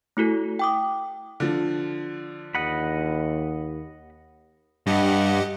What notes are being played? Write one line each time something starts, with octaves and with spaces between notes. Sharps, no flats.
A3 E4 F#4 A4
G5 D6 D#6
D3 F3
D#2 D#5 F#5 B5
G2 G4 D#5 F#5